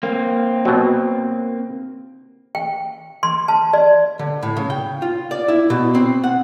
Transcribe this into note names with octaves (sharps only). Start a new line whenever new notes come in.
A#3 C4
B2 F#3
G5
C6
A5
D5
D3
A2
C#3
G5
F4
D5
E4
B2
C4
F#5